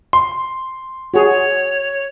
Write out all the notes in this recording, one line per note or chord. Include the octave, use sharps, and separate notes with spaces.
C6
F#4 G#4 C#5